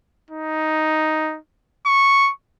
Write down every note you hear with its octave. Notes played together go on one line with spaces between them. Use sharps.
D#4
C#6